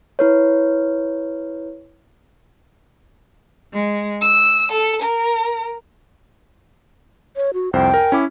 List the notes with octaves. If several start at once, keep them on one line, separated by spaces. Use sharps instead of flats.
E4 B4 C#5
G#3
E6
A4
A#4
C#5
F#4
C2 F2 C5 G5
A#4 G#5
C#4 E4 D6